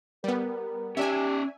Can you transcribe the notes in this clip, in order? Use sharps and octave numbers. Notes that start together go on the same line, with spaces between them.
G3 B3 A#4
C#4 G4 D5 E5 G#5